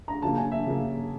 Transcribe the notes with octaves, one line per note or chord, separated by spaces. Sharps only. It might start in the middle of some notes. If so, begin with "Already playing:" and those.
A#5
C#3 F#3 A#3 A5
G#5
E5
C#3 F#3 A#3